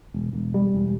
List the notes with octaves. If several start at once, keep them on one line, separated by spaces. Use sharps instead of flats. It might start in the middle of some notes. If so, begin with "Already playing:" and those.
E1
E1
G3
E1